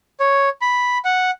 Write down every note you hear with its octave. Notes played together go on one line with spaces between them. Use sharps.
C#5
B5
F#5